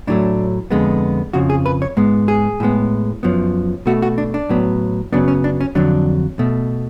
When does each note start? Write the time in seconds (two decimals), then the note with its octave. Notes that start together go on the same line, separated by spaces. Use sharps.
0.07 A2 F#3 A3 D4
0.71 F2 D3 G#3 B3
1.33 F2 C#3 F3 F#4
1.50 G#4
1.66 B4
1.82 C#5
1.97 G#2 G#3 B3
2.28 G#4
2.60 A2 G#3 B3
3.23 F#2 F3 B3
3.86 B2 A3 F#4
4.02 F#4
4.18 D4
4.34 D4
4.49 A2 F#3 B3
5.13 F#2 C#3 F#3 B3 D4
5.28 C#4
5.44 D4
5.61 C#4
5.75 F2 D3 F#3 D4
6.39 B2 A3